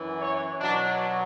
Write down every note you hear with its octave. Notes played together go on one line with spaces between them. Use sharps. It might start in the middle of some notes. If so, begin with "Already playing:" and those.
Already playing: F#2 E3
C#5
B2 F#3 D4